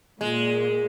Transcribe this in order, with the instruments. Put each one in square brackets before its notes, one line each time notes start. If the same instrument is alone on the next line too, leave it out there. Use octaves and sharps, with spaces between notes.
[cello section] A#2 [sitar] G#3